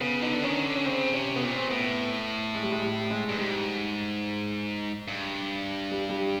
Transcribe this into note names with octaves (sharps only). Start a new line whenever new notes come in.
C#3 B3
D3 D#4
D4
D#3 C#4
D3
C#4
C#3 C4
C3 C#4
B3
A#2 C4
A2 B3
G#3
G3
G#3
G3
G#3
G2
G#2 G3
G2
G3
G3